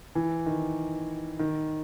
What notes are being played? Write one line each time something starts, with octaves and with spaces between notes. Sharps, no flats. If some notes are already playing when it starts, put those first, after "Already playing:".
E3
D#3
D#3